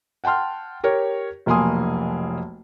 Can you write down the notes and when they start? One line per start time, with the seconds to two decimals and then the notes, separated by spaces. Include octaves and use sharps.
0.24 F#5 G5 A5 C6 F6
0.84 G4 A#4 C#5
1.46 F1 B1 A#3 G#5 C6 D#6